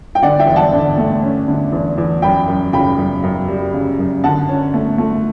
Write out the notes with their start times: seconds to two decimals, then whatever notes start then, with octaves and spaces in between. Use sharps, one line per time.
0.15 G5
0.22 D3 D5 F#5
0.39 E5 G5
0.47 E2
0.56 F#5 A5
0.73 D3
0.98 A3
1.23 C#4
1.48 D3
1.72 E2
1.98 E2
2.22 F#2 G5 B5
2.47 F#2
2.73 C#3 G5 B5
2.98 F#2
3.23 F#2
3.48 G3
3.73 C#3
3.99 F#2
4.24 D3 F#5 A5
4.49 C#4
4.74 A3
4.98 A3